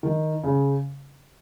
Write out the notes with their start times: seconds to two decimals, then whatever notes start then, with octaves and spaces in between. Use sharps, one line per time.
0.03 D#3
0.44 C#3